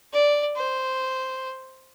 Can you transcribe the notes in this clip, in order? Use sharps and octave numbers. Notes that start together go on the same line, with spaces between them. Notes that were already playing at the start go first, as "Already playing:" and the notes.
D5
C5